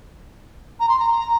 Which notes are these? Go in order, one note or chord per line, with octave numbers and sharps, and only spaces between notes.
A#5
C6
A#5